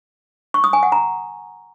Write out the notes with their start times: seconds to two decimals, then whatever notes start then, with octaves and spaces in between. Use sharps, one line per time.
0.54 C#6
0.64 D#6
0.73 G#5
0.83 F#5
0.92 A#5